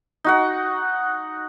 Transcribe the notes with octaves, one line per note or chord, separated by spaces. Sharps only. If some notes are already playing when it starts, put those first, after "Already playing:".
D#4 F#4 F#5